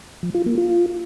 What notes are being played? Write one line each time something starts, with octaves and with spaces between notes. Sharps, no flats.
F3
F4
A#3
F4